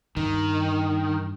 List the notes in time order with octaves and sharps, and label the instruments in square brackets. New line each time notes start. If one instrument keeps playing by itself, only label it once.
[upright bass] G2 [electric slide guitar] D#3